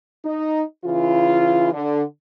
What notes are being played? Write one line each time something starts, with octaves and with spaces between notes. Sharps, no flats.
D#4
C#3 E3 E4 F4
D3